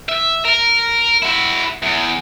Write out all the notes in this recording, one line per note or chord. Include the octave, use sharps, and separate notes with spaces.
E5
A#4
E4 F#4
E2